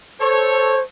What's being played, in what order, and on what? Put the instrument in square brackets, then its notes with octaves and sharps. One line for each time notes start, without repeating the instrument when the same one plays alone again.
[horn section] A4 C#5 [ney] C5